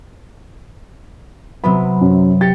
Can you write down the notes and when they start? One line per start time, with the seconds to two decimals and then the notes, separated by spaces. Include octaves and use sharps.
1.64 C3 F#3 B3 B5
2.01 F#2
2.41 G4 A6 C#7